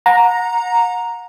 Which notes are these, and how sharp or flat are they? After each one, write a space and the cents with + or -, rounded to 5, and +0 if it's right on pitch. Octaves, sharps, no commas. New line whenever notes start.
F#5 -35 A#5 +0